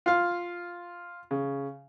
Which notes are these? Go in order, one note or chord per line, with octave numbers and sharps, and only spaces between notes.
F4 F5
C#3